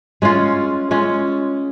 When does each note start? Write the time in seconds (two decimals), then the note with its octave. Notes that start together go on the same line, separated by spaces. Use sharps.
0.22 G#3 C#4 F4
0.91 G#3 C#4 F4